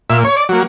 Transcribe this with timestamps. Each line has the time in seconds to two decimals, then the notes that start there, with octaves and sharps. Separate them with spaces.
0.10 A#2 E5
0.24 C#5
0.36 D5
0.49 F#3 A#3